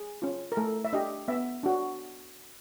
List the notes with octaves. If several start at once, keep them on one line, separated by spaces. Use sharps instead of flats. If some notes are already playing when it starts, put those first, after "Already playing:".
Already playing: G#4
C#4 F4
A#4
A3 A4
E5
D4 G4 D#5
B3 E5
D4 F#4